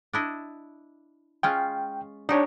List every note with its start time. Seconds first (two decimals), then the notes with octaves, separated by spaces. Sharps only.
0.13 D4 E4 D#5
1.43 G#3 C#4 F4 G5
2.29 D4 D#4 G4 C#5